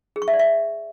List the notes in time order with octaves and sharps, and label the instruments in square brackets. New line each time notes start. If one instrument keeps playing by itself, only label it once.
[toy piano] G#4
C#6
E5
D5
E5